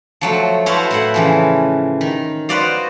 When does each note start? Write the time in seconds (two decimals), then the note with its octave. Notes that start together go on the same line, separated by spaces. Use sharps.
0.21 F3 F#3 A3
0.66 E4 F#4 A4 B4 C5 F5
0.91 A2 E4 F#5
1.14 C#3 E3 F3
2.01 D#3
2.49 F#4 B4 C5 D5 D#5 F5